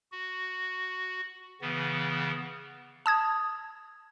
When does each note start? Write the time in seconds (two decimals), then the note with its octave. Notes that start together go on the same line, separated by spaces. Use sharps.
0.12 F#4
1.61 C#3 E3 B3
3.06 A5 D#6 G#6